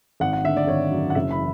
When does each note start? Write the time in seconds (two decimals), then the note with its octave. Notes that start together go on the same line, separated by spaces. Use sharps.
0.20 G#1 F#5
0.33 F#5
0.44 D3 E5
0.57 D5
0.67 G#1 C#5
0.91 F#2
1.10 F#5
1.15 F#1 E5
1.31 B5
1.38 E3